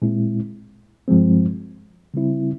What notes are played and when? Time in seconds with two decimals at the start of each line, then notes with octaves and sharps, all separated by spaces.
0.02 A#2 G#3 C4 E4
1.08 G2 F3 G#3 C4
2.14 C#3 G3 C4 E4